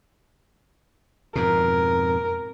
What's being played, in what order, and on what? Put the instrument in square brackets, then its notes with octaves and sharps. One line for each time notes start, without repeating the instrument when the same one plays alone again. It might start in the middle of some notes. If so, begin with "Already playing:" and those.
[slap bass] F2 G#2 B2 [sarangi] A#4